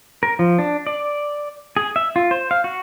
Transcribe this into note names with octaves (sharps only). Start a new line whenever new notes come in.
A#4
F3
D4
D5
G#4
E5
F4
C5
F5
F#4